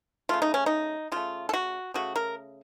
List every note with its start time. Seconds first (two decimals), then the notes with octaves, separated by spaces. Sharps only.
0.29 C#3 A3 F4
0.42 D#4
0.54 C#4
0.66 D#4
1.12 C#3 A3 F4
1.49 A4
1.53 F#4
1.94 C#3 A3 F#4
2.16 A#4